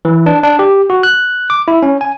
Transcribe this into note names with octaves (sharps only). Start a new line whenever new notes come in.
E3
D4
D4
G4
F#4
F#6
D6
E4
C#4
G#5